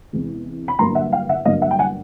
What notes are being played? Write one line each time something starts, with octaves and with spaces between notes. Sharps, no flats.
E2 C3 E3 G#3
B5
G2 D3 F#3 A#3 A#5 C6
E5 F#5
F5 G5
E5 F#5
G2 D3 F#3 A#3 D#5 F5
E5 F#5
G5
F#5 G#5